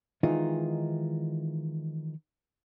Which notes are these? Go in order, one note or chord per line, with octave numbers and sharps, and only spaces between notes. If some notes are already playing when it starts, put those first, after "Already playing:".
D#3 E3 G#3 D#4 F4